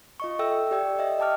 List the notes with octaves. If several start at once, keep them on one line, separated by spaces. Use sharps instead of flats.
F4 D#5 C#6
A4 E5 G5 E6
G5
G4 D5 G5 E6
G4 D#5 E5
D#5 E5 G5 A5 D6 F6